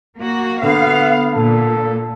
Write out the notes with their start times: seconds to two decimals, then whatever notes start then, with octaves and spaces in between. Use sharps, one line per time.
0.17 A#3 F#4
0.63 D3 B3 F5
1.34 A#2 A4